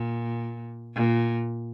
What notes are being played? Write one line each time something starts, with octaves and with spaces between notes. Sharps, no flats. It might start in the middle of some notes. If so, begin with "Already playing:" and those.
Already playing: A#2
A#2